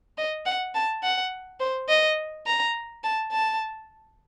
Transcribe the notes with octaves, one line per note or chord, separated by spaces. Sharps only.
D#5
F#5
A5
F#5
C5
D#5
A#5
A5
A5